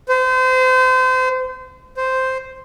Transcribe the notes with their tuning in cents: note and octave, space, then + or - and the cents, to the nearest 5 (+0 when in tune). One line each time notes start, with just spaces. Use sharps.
C5 -30
C5 -5